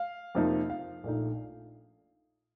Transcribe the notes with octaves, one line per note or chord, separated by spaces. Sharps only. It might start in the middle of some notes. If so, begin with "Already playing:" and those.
Already playing: F5
F2 C3 F3 A#3 D#4
F5
A#1 A#2 A3 D#4